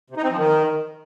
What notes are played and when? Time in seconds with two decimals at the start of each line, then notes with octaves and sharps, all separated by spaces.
0.10 C3
0.17 D#4
0.24 C4
0.31 F3
0.38 D#3